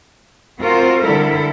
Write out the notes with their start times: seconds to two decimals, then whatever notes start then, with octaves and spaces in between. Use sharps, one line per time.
0.61 C4 F4 F#4 A#4 C5
1.02 D3 G3 E4 A4 A#4